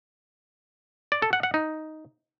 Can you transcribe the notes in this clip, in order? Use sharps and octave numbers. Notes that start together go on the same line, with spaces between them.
D5
A4
F#5
F#5
D#4